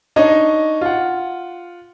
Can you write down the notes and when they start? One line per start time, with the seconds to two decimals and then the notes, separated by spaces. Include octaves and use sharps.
0.16 D4 D#4 C#5 D#5
0.81 F4 F#5